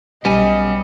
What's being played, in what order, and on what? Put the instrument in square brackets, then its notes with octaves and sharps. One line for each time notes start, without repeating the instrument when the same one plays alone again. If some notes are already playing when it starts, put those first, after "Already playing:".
[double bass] B1 [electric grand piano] G3 [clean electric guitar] B3 C#4 G#5 [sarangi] D#5